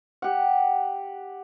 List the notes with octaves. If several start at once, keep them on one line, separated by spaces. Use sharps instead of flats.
G4 F#5